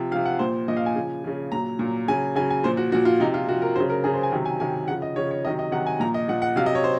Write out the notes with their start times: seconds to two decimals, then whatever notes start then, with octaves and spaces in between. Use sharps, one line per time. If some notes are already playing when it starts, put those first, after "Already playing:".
Already playing: C3 F3
0.11 F3 F5
0.16 C3
0.25 F#5
0.39 A#2 F3 C5
0.68 A#2 F3 D#5
0.77 F5
0.86 G#5
0.95 C#3 F3
1.24 C#3 F3
1.52 A#2 F#3 A#5
1.79 A#2 F#3
2.08 C#3 F#3 G#5
2.35 C#3 F#3 G#5
2.50 G#5
2.63 A#2 F3 C5
2.77 F#4
2.92 A#2 F3 F#4
3.05 F4
3.20 C3 F3 D#4
3.34 F4
3.48 C3 F#4
3.51 F3
3.62 A#4
3.75 F#3 C5
3.80 C#3
3.90 A#4
4.03 C#3 F#3 G#4
4.14 C5
4.23 G#5
4.32 C3 D#3 F#3
4.45 G#5
4.60 C3 D#3 F#3 G#5
4.88 C#3 F3 F#5
5.02 D#5
5.16 C#3 F3 C#5
5.31 C#5
5.44 C3 D#3 F#3 D#5
5.59 D#5
5.72 C3 D#3 F#3 F#5
5.86 G#5
6.00 A#2 F3 A#5
6.14 D#5
6.28 A#2 F3 F#5
6.42 F#5
6.56 C3 F#3 F5
6.66 D#5
6.75 C#5
6.84 C5